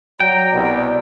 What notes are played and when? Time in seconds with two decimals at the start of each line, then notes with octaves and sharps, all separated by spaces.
0.20 F#3 D5 G5 A#5
0.53 C2 B2